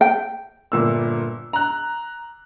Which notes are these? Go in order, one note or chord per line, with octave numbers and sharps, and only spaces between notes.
G5
G1 A#2 E6
A#5 F#6